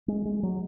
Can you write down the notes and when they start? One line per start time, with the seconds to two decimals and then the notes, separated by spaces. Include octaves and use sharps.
0.08 G#3
0.25 G#3
0.43 F#3